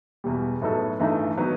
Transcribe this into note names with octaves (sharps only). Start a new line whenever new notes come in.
E2 B2 G3
A2 F#3 B3 D#4 A4
G2 E3 A3 D#4
D#3 F#3 B3 D#4